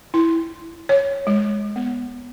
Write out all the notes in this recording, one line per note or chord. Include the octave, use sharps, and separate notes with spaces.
E4
C#5
G#3
B3